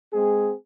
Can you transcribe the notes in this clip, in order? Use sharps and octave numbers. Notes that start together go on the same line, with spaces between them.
G#3 C4 G#4